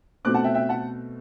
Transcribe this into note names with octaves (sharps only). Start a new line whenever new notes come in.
B2 A3 C4 D6 F#6
F#5 A5
E5 G5
E5 G5
F#5 A5